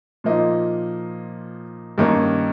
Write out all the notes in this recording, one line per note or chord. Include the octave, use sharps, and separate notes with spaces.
A#2 F3 A#3 D#4
G2 D#3 A#3 C#4